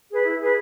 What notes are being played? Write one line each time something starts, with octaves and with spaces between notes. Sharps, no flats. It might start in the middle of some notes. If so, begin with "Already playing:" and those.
G#4 B4
E4
G#4 B4